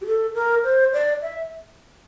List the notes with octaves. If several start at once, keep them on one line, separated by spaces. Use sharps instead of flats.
G4
A4
A#4
C5
D5
E5